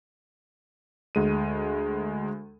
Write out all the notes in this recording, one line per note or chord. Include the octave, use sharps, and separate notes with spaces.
D2 G#3 D#7